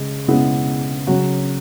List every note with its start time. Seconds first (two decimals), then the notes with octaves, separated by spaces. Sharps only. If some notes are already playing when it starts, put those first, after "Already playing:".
Already playing: C#3 G#3
0.28 C#3 G#3 B3 E4 G#4
1.07 C#3 F#3 C#4 F#4